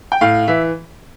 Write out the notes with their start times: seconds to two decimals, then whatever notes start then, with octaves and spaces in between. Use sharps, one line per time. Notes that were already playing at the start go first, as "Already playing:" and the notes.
0.12 G5
0.21 A2 F5
0.48 E3 E5